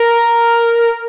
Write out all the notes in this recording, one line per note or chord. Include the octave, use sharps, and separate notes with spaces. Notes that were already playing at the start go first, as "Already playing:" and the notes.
Already playing: A#4